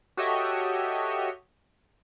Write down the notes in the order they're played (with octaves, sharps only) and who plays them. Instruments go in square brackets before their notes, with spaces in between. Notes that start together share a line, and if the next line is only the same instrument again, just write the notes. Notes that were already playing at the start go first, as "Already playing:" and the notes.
[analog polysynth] F#4 G4 A4 C#5 D#5 E5